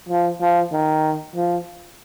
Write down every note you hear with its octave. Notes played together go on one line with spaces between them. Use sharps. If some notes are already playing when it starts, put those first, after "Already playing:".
F3
F3
D#3
F3